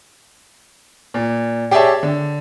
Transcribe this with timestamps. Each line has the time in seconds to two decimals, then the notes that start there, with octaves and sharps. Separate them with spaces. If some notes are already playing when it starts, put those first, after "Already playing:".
1.14 A#2
1.71 G4 G#4 C#5 D5 E5 A5
2.03 D3